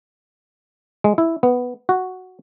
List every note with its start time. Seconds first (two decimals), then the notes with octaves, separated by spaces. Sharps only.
1.04 G#3
1.18 E4
1.43 B3
1.89 F#4